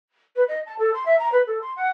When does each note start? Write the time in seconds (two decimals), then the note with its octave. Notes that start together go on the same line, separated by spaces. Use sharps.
0.36 B4
0.48 D#5
0.66 A5
0.79 A4
0.94 C6
1.06 E5
1.19 A#5
1.32 B4
1.47 A4
1.62 C6
1.76 F#5